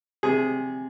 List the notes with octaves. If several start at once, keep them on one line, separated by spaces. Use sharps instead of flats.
C3 G#4